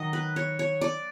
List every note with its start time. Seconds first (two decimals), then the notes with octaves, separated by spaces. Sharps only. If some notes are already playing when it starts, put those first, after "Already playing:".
Already playing: D#3 F#3 D#5
0.13 B4
0.36 C#5
0.59 C#5
0.81 D5